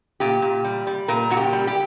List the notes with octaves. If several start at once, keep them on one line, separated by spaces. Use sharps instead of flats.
A#2 G4
A#2
G3
G3
A#2 A#4
A#2 F#4
G4
G3
G4